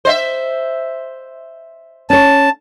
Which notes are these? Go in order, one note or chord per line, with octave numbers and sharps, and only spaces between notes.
C5 D#5 E5
C#4 C#5 A5